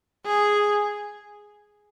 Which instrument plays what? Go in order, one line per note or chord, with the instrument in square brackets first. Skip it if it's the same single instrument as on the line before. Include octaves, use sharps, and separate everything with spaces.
[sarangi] G#4